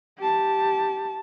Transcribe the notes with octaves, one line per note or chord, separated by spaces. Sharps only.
G4 A5